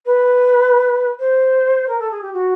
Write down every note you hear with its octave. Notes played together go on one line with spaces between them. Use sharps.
B4
C5
A#4
A4
G#4
G4
F#4